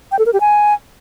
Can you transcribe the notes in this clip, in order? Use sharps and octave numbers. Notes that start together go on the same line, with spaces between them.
G5
A4
A#4
G4
G#5